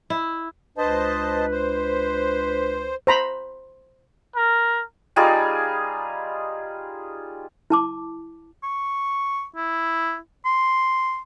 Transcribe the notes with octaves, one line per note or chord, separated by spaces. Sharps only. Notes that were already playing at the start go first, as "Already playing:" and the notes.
E4
C#2 D4 B4 C5 D#5 A5
C5
C5 A#5 B5
A#4
G3 D#4 F4 G#4
E4 A5 D6
C#6
E4
C6